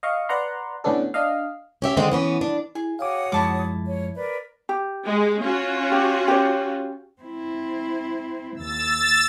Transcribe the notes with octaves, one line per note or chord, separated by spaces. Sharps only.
D#5 F5 C#6
B4 D5 F#5 A#5 C6
A2 D3 B3 C#4 D4 A4
D4 D#5 F5
C#4 G4 E5
D3 D#3 G#3 C4 D#4
E3 B3 C#4
D4
E4 G#4
F#4 C#5 F5 G5 D6 D#6
F#2 F3 G#3 E4 A5 D6
C#5
A#4 B4 D5
G4
G#3
C#4 F4 F#4
G4
G4 C#5
C4 E4
D#2 E6 A6